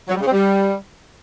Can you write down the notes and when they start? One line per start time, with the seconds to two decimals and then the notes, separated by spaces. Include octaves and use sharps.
0.08 F#3
0.14 G3
0.20 C#3
0.26 C4
0.32 G3